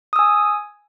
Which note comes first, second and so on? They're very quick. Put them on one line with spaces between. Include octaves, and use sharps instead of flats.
D#6 E6 G#5